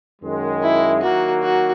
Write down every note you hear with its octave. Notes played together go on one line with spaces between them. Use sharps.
F#2 D#3 G#3
E4
D#3 F#3 A#3 F#4
F#4